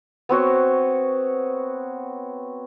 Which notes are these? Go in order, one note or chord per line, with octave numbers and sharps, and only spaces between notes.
B3 C4 F#4 C#5